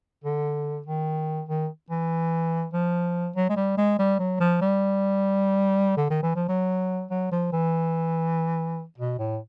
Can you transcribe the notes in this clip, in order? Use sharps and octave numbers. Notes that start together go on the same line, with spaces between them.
D3
D#3
D#3
E3
F3
F#3
G#3
G3
G#3
G3
F#3
F3
G3
D3
D#3
E3
F3
F#3
F#3
F3
E3
B2
A2